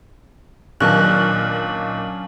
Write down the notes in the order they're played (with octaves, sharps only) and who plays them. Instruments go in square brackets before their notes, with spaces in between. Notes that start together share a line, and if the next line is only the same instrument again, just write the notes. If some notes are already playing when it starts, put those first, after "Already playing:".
[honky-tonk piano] A#2 D#3 [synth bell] F#3 F5 F#7 [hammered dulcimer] C#4 D4 [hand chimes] F#6